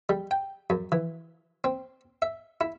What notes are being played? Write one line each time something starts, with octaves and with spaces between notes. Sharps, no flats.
G3
G5
F#2
E3
C4
E5
E4